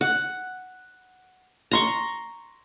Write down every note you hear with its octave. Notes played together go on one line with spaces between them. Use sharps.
F#5
A#5 C6 C#6